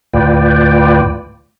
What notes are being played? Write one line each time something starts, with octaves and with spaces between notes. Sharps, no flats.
D2 A2 F4 B4 D5 G5